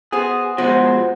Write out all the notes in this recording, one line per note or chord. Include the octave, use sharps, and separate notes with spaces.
B3 F#4 G#4 C5
B2 F3 G#3 F#4 C5